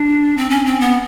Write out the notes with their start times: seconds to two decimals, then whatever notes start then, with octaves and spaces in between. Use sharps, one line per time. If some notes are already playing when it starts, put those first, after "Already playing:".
Already playing: D4
0.37 C4
0.50 C#4
0.66 C4
0.81 B3